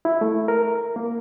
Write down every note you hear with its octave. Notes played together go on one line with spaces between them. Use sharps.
E4
A3
A#4
A#3